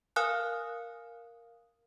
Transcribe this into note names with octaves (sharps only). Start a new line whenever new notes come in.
A#4 F5 G#5 D#6 F6 F#6